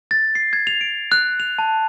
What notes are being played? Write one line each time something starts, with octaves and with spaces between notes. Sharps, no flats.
A6
C7
G#6
F7
D7
F#6
F7
A5